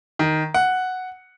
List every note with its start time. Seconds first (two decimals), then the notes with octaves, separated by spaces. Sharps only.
0.19 D#3
0.54 F#5